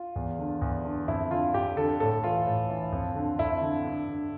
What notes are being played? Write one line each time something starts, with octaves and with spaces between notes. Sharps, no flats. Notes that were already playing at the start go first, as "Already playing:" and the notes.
Already playing: F4
E2
D3
E2
D3
F2 E4
D3 F4
F2 G4
D3 A4
A2 A4
E3 F4
A2
E3
F2
D3
F2 E4
D3
G2
D3